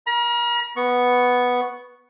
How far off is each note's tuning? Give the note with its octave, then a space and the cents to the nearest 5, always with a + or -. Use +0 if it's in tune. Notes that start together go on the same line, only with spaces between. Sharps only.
A#4 +0 A#5 +45
B3 +0 C#6 +0